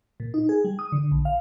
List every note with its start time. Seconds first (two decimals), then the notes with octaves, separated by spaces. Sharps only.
0.20 A#2
0.34 D#4
0.49 G#4
0.65 G3
0.79 D#6
0.92 D3
1.12 A#1
1.25 F5